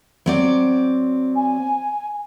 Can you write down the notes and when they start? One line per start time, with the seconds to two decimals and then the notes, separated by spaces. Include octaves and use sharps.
0.26 F#3 C4 D5
1.36 G#5